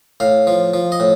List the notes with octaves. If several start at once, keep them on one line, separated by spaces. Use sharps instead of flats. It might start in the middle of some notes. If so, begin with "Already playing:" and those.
A2 F5
F3
F3
D#5
A2